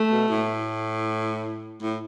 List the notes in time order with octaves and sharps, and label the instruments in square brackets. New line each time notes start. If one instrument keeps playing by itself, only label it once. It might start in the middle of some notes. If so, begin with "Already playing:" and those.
Already playing: [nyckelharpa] A3
[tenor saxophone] B2
A2
A2